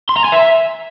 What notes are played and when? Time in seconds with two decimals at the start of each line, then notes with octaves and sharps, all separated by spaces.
0.09 C6
0.17 A#5
0.24 G#5
0.32 E5